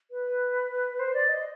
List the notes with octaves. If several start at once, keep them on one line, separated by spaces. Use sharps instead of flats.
B4
C5
D5
D#5